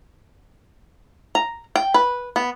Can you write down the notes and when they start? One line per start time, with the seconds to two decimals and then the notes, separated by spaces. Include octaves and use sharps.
1.35 A#5
1.76 G5
1.94 B4
2.36 B3